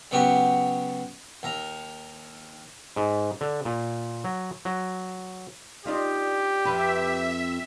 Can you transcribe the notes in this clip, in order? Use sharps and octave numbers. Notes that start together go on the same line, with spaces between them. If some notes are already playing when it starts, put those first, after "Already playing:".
C#3 F#3 B3 F#4 G4
D#2 A#5
G#2
D3
A#2
F#3
F#3
D4 D#4 F4 G4
F2 B4 E5